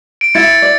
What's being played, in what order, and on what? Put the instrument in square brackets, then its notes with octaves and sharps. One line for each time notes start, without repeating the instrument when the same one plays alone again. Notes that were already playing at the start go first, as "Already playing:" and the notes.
[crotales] D7
[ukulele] E4 [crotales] A6 C#7
[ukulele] D5